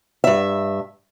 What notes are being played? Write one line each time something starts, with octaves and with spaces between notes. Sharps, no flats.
G2 E5